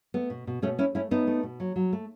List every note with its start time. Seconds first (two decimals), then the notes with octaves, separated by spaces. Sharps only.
0.14 A3 B3
0.30 B2
0.47 B2
0.62 B2 A3 C#4
0.79 A3 C#4 E4
0.95 A3 C#4 E4
1.11 A3 B3 D#4
1.27 A3
1.43 B2
1.60 F#3
1.76 F#3
1.93 A3